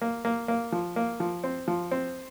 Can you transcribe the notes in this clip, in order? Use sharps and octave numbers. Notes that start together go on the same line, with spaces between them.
A#3
A#3
A#3
F3
A#3
F3
C4
F3
C4